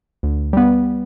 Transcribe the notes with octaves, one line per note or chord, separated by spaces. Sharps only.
D2
G3 B3